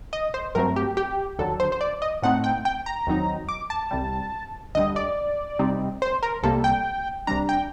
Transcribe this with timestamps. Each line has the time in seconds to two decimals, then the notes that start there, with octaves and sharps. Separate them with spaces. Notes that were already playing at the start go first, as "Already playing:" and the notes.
0.13 D#5
0.34 C5
0.55 G2 F#3 A3 C4 A#4
0.76 G4
0.97 G4
1.39 D#2 D3 F#3 A4
1.60 C5
1.72 C5
1.81 D5
2.02 D#5
2.22 A2 A3 C4 D#4 F#5
2.44 G5
2.65 G5
2.86 A#5
3.07 D#2 D#3 F#3 C4 D#4
3.49 D6
3.70 A5
3.91 C2 C3 G3
4.75 D2 D3 G3 D#5
4.96 D5
5.59 C3 G3 C4 D#4
6.02 C5
6.23 A#4
6.43 C2 C3 G3 A#3 A4
6.64 G5
7.27 C2 C3 G3 D4 A#5
7.49 G5